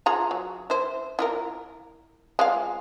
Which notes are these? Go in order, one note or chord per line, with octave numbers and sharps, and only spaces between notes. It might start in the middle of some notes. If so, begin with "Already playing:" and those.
F4 G#4 A#5
F#3
E4 C5
E4 F4 A#4
G#3 F4 F5